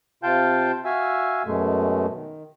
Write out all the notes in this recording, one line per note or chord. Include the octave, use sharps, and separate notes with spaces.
C3 F4 F5 G5 A5 G6
F#4 E5 F5 G#5 E6
F#2 B2 G#3 A3
D#3